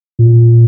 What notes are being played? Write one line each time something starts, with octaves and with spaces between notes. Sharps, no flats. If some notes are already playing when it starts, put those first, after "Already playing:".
A#2